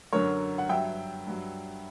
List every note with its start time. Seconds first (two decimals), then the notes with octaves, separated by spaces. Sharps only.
0.13 F#2 D3 F#3 A#4 C#5
0.58 F#5
0.69 G2 F#3 E5 G5
1.27 G2 F#3